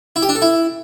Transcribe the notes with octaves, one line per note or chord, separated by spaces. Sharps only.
E4
G4
D4
A4
E4